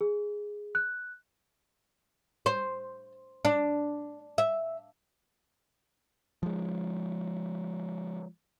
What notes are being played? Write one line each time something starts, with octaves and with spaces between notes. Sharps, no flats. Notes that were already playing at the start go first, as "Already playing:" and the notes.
G#4
F#6
C5
D4
E5
F3 G#3